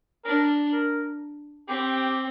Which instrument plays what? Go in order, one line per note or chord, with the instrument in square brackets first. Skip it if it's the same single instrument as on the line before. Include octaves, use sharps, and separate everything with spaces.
[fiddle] D4 [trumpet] A#4
[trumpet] A#4
[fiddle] C4 [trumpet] G4